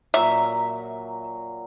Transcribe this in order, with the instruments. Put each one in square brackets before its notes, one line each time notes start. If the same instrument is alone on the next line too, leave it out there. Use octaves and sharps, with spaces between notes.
[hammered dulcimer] A#2 F#3 [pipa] E5